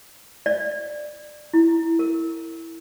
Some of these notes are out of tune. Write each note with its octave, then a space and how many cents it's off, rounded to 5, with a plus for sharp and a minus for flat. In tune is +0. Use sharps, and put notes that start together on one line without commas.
D5 +20
E4 +0
A#4 -30